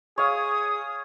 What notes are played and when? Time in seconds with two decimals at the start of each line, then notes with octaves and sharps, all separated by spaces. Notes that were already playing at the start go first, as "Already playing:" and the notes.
0.18 G#4 C#5 F5 D#6